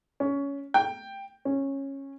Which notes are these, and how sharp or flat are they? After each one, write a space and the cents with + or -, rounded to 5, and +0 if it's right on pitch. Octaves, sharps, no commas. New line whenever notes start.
C#4 +15
G5 +5
C#4 -15